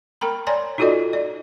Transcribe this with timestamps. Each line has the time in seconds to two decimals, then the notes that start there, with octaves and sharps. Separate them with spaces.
0.21 A#4 G5 A#5 B5
0.47 C#5 D5 G#5 A#5 C6
0.78 D#4 F4 F#4 A4 D5 D#5
1.13 D5